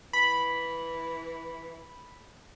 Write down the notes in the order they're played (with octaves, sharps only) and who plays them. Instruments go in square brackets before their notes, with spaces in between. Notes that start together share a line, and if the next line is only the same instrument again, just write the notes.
[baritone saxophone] E3 [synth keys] B5